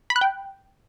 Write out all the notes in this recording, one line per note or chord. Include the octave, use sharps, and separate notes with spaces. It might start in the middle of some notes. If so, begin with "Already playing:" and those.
B5
F#6
G5